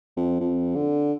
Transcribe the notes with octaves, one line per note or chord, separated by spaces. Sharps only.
F2
F2
D3